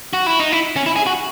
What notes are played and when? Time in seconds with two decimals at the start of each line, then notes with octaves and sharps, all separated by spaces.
0.13 F#4
0.27 E4
0.40 D#4
0.52 E4
0.76 C#4
0.86 E4
0.96 G#4
1.06 F#4